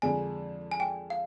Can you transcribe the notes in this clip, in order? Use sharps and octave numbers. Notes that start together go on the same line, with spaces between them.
F2 D3 G#3 D4 G#5
G#5
G5
F5